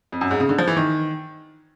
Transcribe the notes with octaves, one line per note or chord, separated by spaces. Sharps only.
F2
F#2
G#2
C#3
D3
F3
E3
D#3